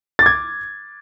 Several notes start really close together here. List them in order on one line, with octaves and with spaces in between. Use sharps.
A6 D6 G#6